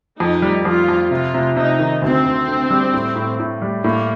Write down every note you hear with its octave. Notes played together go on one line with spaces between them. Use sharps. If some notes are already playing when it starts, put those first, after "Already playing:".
F2 D#4
G3
F2 F4
F2
C3 F4
C3
C3 D#4
D#3
D2 C4
D2
D3
G3
A2
A2
A2
G3
A2 A#3